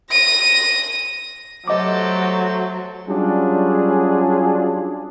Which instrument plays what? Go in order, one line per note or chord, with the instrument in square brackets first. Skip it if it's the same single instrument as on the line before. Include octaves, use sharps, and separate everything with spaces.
[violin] A#6 D#7
[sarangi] F#3 [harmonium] A3 C5 [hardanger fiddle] G4 A4 [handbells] D#5 D6
[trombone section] F#3 G3 C#4 D4 F4 G#4